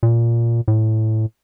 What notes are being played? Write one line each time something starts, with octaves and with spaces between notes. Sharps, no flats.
A#2
A2